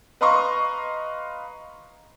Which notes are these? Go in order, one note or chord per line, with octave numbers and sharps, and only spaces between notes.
B4 D#5 F5 A#5 C6 C#6